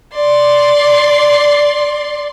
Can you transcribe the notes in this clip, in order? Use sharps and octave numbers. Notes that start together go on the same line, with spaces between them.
D5 C6